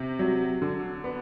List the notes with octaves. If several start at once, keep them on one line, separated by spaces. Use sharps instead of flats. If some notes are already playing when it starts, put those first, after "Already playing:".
Already playing: C3
F#3
D3
B3